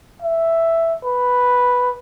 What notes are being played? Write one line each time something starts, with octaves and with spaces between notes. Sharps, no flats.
E5
B4